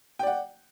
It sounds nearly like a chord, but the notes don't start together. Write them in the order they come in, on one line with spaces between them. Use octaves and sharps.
G5 D5 F#5